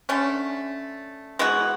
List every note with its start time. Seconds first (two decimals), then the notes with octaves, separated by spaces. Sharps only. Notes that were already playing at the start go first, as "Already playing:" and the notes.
0.09 D3 A3 C#4
1.39 E3 G#3 B3 F#4